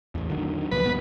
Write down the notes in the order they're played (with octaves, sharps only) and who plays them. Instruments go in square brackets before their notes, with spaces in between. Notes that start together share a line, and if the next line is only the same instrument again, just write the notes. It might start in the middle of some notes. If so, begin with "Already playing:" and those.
[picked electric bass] A1 E2
D3 D#3 F#3
[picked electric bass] C#2 A#2 F3 [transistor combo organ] B4
[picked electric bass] D1 G2 B3